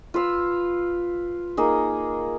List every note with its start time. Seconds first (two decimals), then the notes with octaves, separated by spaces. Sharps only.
0.14 F4 B4 F5 E6
1.57 A#3 D#4 G#4